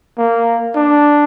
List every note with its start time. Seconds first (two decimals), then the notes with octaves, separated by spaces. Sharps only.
0.18 A#3
0.75 D4